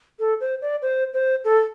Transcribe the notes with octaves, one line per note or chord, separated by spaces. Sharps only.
A4
C5
D5
C5
C5
A4